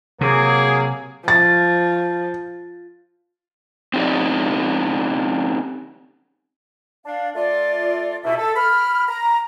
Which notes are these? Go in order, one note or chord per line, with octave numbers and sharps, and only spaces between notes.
C3 F#3 A#3 G#4
F3 A6
C4 C#4 D#4 G4 D5
D4 F5
A3 F4 D5
C#2 B2 E4 E5
A4
B5 F6
A#5